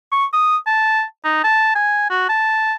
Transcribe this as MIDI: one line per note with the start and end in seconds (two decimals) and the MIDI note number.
0.12 0.25 85
0.33 0.57 87
0.67 1.03 81
1.25 1.42 63
1.44 1.75 81
1.75 2.06 80
2.10 2.27 66
2.29 2.74 81